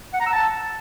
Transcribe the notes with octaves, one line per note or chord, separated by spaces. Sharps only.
F#5
A#5
E6
A5